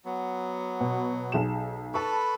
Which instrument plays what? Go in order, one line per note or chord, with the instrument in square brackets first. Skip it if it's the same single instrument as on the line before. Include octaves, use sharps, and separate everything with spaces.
[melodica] F#3 B3
[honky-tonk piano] B2
B1 G#4 E7
[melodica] A4 B4 B5 [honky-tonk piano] A5 C#6